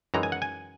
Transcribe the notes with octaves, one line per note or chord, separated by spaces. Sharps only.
F#2 E3 G#3 D#4 A#5
G#5
F#5
G#5